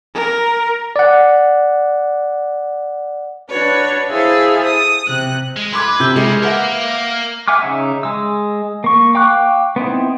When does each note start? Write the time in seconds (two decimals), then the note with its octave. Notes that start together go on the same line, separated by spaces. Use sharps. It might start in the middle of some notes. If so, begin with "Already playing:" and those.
0.15 A#4
0.96 D5 F#5
3.50 D4 F#4 B4 C#5
4.09 E4 G#4 A4 C5 E5 F5
4.65 D#6
5.07 C3 F#6
5.56 G#3
5.73 B4 C6 D6 G#6
6.00 C3 G6
6.16 C#3 G#3 A#4
6.42 A#3 A#4 B4 E5 F#5
7.48 E5 F#5 G#5 D6 F6
7.62 C#3 D#4 E5
8.03 G#3 E6
8.84 A#3 C#6
9.15 F5 G5 C#6 D6 F#6
9.76 B3 C4 D#4 E4